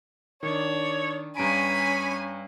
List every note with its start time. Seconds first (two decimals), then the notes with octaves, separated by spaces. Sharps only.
0.43 D#3 D4 C#5
1.37 G2 C#4 G#5 A#5 B5 D7